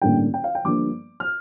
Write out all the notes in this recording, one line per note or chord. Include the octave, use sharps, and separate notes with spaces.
A1 G2 D3 G3 A#3 G5
G5
F5
G5
G1 G2 F3 A#3 D4 D6
F6